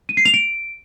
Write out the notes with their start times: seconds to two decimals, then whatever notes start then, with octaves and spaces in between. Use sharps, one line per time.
0.09 D#7
0.17 C7
0.25 F7
0.34 D7